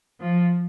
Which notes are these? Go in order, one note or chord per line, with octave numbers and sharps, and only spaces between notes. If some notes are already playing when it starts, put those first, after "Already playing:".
F3